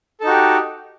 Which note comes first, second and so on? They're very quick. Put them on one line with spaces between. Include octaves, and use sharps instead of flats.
A4 D#4 F#4 G4